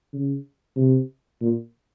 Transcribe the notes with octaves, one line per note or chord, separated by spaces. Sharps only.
C#3
C3
A#2